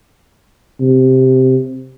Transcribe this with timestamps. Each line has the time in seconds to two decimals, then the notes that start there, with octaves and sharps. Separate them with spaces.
0.81 C3